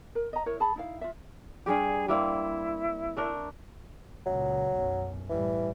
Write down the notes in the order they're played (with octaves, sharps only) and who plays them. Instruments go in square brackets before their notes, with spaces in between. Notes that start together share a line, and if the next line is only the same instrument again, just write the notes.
[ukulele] A#4
D#5 A#5
E4 A#4 C#5
G#4 A5 B5
D#4 E4 F5
F4 E5
[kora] G2 G3 G4 [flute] G#4
[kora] G3 A#3 C4 [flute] E4
[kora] A3 D4 A#4
[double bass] C#2 A#2 [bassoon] F#3
[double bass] B1 F#2
[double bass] A2 G3 [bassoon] E3